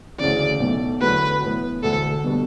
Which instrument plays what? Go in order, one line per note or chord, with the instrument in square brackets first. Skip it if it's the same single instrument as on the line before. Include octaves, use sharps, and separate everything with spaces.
[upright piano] D2 C#3 E3 [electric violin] D5
[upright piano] B1 B2 A3
[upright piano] E2 D3 F#3 A3 E4 [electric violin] B4
[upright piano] A2 E3 B3
[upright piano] E1 D2 D3 [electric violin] A4
[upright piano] B2 G3 B3 D4